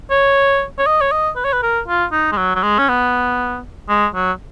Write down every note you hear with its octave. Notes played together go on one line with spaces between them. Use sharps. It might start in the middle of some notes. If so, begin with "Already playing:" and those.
C#5
C#5
D#5
C#5
D#5
B4
C#5
B4
A#4
F4
D#4
G#3
F#3
F#3
G#3
C#4
B3
G#3
F#3